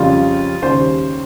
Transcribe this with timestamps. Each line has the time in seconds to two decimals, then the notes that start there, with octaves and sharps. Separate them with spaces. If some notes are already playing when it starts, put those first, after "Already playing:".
Already playing: F2 C#3 G3 F4
0.62 D#2 C#3 G3 C5